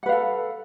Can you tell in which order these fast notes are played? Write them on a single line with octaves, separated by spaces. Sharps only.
F#5 B4 F5 A4